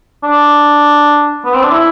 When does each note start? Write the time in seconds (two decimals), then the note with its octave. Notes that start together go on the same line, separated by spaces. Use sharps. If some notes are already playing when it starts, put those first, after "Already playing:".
0.23 D4
1.45 B3
1.54 C4
1.63 D4
1.71 E4